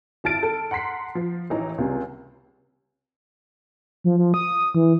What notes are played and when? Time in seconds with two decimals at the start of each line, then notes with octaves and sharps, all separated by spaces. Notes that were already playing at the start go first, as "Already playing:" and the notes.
0.24 G#1 E4 A5 F6 A6 D7
0.43 A4
0.71 F#5 A#5 C6 B6 C7
1.15 F3
1.50 A1 E3 D#4 A#5
1.78 C#2 C3 G3
4.04 F3
4.19 F3
4.34 D#6
4.75 E3